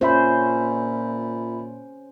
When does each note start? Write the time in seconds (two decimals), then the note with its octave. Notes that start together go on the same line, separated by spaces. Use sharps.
0.01 A#2 C#4 F4 C5 E5 B5